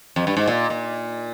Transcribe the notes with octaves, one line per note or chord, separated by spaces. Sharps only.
F2
G2
G#2
A#2
A#2